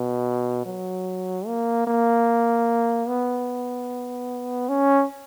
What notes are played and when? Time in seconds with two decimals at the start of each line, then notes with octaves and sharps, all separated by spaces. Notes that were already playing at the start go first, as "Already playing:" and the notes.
Already playing: B2
0.66 F#3
1.47 A#3
1.87 A#3
3.08 B3
4.69 C#4